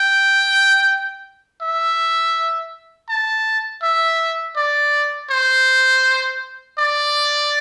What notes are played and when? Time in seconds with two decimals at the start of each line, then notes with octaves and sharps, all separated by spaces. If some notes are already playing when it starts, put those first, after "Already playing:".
Already playing: G5
1.62 E5
3.09 A5
3.83 E5
4.57 D5
5.31 C5
6.79 D5